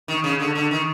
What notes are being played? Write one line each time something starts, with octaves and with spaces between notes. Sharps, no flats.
D#3
C#3
D3
D3
D#3